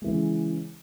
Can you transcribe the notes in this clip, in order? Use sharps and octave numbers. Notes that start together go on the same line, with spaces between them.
C#3 E3 G#3